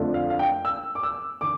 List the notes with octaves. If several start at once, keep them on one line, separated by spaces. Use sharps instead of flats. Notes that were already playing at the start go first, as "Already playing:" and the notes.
Already playing: F2 D3 A3 D4 F4
F5
F5
G5
E6
D6
E6
D3 D6